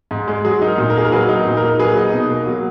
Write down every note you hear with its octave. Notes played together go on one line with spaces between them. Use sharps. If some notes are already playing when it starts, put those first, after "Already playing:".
G#2
G#3
F#3 G#4
D#4
A#4
A#2
A#4
A#3 G#4
A#4
F#3 G#4 B4
D#4
A#2
A#4
A#3
F#3 G#4 B4
D#4
B2
A#3
F#3